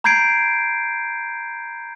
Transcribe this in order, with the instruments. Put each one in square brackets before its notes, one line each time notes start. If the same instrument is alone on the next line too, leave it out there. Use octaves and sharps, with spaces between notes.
[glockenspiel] A#5 B5 G6 G#6 C7 D7